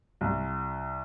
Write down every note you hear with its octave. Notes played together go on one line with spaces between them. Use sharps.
C2